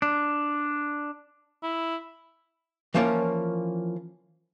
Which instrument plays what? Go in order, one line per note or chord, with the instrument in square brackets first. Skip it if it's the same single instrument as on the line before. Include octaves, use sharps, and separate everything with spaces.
[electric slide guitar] D4
[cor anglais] E4
[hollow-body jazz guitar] E3 F3 A#3 C#4 C#5 D5